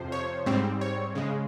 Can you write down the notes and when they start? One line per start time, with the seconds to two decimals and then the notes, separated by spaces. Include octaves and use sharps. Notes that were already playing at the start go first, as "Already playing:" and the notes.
Already playing: F2 C3 F3 C5
0.12 C#5
0.46 G#2 G3 C4
0.81 C#5
1.15 C#3 G#3